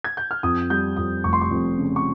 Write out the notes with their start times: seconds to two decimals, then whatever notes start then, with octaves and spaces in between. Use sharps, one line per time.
0.04 G#6
0.17 G6
0.31 F6
0.43 F2 D#6
0.70 G3 G6
0.96 F2 D#6
1.24 F1 C#6
1.33 C6
1.41 C#6
1.51 F2
1.78 C#3
1.96 C#6